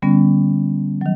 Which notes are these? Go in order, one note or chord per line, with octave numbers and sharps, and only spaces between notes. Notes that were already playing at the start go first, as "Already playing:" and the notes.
D3 G3 B3 C#4
D#3 F#3